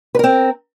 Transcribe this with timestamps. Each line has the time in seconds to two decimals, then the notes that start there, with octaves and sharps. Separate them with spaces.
0.15 B4
0.19 A#4
0.24 C4